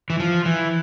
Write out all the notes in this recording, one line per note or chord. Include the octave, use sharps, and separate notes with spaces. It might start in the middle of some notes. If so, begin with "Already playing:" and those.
E3
F3
E3